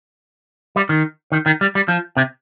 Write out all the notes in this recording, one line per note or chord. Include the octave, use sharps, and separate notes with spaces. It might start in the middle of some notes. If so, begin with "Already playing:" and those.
G3
D#3
D#3
D#3
G3
G3
F3
C3